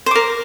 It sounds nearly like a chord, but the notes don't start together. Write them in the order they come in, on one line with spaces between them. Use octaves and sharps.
C5 D6 A#4